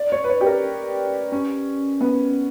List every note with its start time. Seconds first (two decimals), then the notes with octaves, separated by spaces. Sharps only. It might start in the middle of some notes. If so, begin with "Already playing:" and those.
Already playing: D5
0.12 C#5
0.24 B4
0.29 C#5
0.41 G4
0.46 A#4
1.32 C#4
2.01 B3